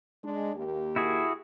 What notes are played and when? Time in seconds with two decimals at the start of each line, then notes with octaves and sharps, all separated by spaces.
0.23 G#3 D4
0.55 D#2 A#3 G4
0.96 E4 F#4 G#4